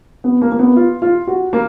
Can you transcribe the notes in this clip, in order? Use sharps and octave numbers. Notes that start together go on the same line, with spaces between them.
B3
A#3
A#3
B3
F4
F4
F#4
A#3